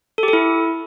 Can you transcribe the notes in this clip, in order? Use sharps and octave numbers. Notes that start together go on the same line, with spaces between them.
A4
G4
A4
E4